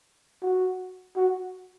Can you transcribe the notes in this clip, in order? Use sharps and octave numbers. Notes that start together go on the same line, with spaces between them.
F#4
F#4